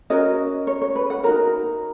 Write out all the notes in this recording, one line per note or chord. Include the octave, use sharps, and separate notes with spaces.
C#4 F#4 A#4 D#5
C#5
C#5
B4
F#5
D#4 F#4 A#4 A#5